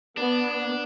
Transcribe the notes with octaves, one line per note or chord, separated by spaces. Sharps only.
B3 D4